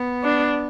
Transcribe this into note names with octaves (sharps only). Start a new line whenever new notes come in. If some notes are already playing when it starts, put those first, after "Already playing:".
Already playing: B3
D4